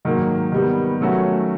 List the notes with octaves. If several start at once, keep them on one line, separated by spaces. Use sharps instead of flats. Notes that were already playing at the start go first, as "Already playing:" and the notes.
G#2 D#3 F#3 A#3
D#3 G3 B3
D#3 F#3 A3 C#4 F#4